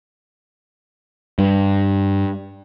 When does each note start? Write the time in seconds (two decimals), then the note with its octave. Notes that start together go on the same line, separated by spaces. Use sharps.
1.39 G2